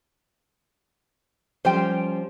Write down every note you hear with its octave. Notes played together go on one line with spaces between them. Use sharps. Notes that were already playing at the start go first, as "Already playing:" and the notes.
F3 G3 C#4 C5 G5